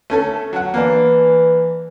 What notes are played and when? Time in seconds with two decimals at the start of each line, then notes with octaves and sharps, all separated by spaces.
0.10 A3 C#4 A4
0.53 F#3 F#5
0.74 E3 A#3 D4